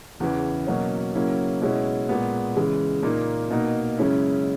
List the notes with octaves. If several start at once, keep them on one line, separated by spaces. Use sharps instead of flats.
E2 C#3 E3
B2 F#3 A#3 C#4
C#3 F#3 A#3 C#4 E4
B2 G#3 C#4 E4
A#2 G#3 B3
C#3 E3 G#3
A#2 A#3 D#4
B2 A#3 D#4
F#2 C#3 G#3 C#4 E4